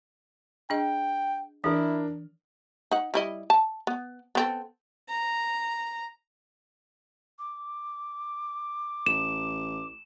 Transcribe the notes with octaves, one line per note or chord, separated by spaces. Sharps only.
D4 G#4 D#5 G5
E3 D4 E4 A#4
D#4 F#5
G3 E4 D#5
A5
B3
B3 C4 A4
A#5
D6
A1 E7